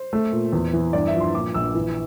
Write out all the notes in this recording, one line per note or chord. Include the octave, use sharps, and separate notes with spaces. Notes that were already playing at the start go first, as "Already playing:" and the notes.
Already playing: C5
A3
A#2
E2
E3
G2 D5
E5
F3
C6
A#2 D6
A#1 E6
E3